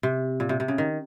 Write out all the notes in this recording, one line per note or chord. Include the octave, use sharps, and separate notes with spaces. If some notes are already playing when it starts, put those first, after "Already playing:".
C3
A#2
C3
C3
C#3
D#3